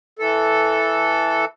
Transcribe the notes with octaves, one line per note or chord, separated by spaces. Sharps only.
E3 A4